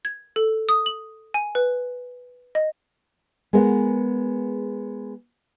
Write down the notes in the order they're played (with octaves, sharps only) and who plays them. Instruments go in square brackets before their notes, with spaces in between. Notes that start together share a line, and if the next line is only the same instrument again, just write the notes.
[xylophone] G#6
A4
D#6
F#7
G#5
B4
D#5
[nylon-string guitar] G#3 B3 G#4 A#4 F#5